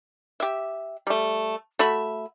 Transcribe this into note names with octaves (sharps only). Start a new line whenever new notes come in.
G4 E5
G3 A3
A3 F#4 E5 B5